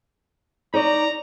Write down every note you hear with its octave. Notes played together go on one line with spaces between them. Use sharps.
D#4 C#5 D5 A#5